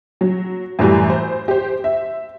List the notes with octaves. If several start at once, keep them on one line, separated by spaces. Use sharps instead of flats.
F#3
F#2 A2 E3 G3
C5
G4 C5
E5